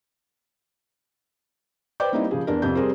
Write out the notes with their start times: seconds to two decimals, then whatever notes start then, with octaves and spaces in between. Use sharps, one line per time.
2.00 B4 C5 D5 G5 D6 G6
2.12 G3 A#3 C4 D#4 E4 G4
2.31 C#3 F3 G#4
2.47 E2 D4 A#4
2.62 F2 C3 G6
2.75 G3 C4 G#4 A#4 C5